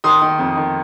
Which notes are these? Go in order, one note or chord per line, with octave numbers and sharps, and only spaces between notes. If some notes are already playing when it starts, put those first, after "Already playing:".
D#3 C6 D#6
D#3
F2
D#3